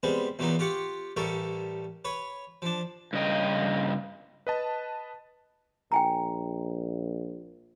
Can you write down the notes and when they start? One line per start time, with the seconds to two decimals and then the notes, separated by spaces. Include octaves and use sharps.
0.03 G3 G#3 B3 C4
0.39 E2 A#2 F#3 A#3 B3 D#4
0.59 F4 G4 F#5 C#6
1.16 A1 G3 A4 A#4 C#6
2.05 B4 C#5
2.62 F3 D4
3.13 G2 C#3 D#5 G5
4.47 B4 D#5 A5
5.92 A#1 G5 G#5 A#5